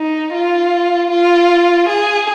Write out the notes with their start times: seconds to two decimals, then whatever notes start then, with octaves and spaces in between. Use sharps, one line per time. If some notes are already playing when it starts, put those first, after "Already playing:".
Already playing: D#4
0.34 F4
1.10 F4
1.89 G#4